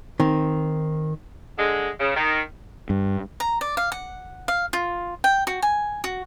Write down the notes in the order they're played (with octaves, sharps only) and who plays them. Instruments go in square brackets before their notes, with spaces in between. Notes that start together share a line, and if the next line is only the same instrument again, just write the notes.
[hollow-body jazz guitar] D#3 C4
[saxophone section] D3 G#3
C#3
D#3
[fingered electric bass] G2
[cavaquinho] A#5
D5
F5
F#5
F5
F4
G5
F#4
G#5
F#4